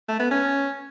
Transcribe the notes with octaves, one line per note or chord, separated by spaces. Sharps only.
A3
B3
C#4